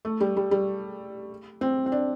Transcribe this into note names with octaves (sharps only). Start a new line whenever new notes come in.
A3
G3
G3
G3
C4
C4
D4